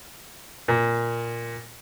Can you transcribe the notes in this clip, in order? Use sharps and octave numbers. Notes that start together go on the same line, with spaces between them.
A#2